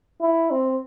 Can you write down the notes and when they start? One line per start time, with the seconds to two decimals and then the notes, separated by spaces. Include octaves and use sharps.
0.21 E4
0.51 C4